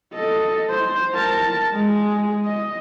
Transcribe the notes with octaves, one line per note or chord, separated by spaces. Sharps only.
A4 D#5
C5
A#4 A5
G#3 G#4
D#5